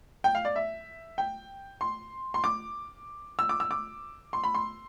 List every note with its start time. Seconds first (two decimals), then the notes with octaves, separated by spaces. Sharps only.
0.24 G5
0.35 F5
0.45 D5
0.56 E5
1.18 G5
1.81 C6
2.34 C6
2.44 D6
3.39 E6
3.49 D6
3.60 E6
3.71 D6
4.33 C6
4.44 B5
4.54 C6